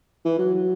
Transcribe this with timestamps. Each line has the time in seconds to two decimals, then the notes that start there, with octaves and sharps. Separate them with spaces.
0.25 E3
0.39 F#3
0.54 F#3